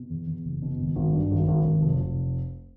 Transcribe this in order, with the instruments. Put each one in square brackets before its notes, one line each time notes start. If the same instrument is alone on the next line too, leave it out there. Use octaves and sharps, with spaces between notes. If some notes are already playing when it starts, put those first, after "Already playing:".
Already playing: [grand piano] B2
E2
E2
F#1
B2
G#1
G#1
G2
G#1
G#1
G#1
F1
F1